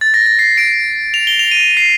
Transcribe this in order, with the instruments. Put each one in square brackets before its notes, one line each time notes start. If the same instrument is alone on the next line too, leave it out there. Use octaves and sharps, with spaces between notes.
[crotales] A6
A#6
A#6
C7
D7
F7
G7
F7
D#7
C7